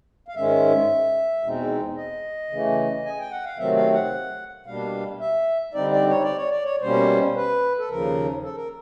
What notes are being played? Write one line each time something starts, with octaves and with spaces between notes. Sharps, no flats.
F5
G#2 D#3 G#3 C#4 E5
E2 B2 G#3 C4 D#4
D#5
C#3 E3 A3
G#5
G5
F#5
F5
C3 D#3 F#3 A3 C4 E5
F5
F#5
B2 G3 A#3 D4 F5
E5
D3 G3 C4 D#4 D5
D5
C#5
D5
C#5
D5
C#5
B2 G3 A#3 C#4 C5
B4
A4
D#2 C#3 F3 A#4
A4
A#4